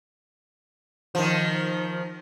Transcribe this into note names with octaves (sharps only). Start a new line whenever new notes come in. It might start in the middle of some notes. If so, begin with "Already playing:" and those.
D#3 F3